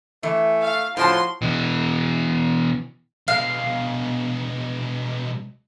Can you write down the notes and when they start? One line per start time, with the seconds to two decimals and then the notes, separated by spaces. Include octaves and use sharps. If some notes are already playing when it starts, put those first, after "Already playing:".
0.23 E3 A3
0.61 F5
0.97 A2 F3 F#4 A5 C6
1.42 B2 E3
3.28 B2 G#3 F5